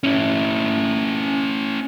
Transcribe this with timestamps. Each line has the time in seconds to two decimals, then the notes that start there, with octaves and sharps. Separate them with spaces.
0.04 C#4 E4